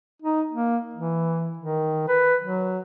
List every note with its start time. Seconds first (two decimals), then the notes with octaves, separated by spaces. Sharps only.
0.22 D#4
0.51 A#3
0.94 E3
1.57 D#3
2.08 B4
2.41 F#3